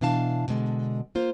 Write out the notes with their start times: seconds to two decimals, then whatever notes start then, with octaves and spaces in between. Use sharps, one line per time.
0.01 B2 E3 D4 F5 A5
0.48 B2 D3 G#3
1.15 A#3 F4 C5